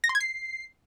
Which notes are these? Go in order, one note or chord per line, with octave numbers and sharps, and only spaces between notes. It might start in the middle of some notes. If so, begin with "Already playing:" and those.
A#6
C6
G#6
C7